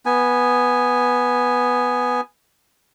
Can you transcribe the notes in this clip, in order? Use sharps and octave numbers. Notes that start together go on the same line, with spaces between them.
B3 G#5